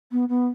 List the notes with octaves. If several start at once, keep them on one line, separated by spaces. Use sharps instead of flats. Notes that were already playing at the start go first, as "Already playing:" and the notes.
B3
B3